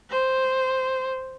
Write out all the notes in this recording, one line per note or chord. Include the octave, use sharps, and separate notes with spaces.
C5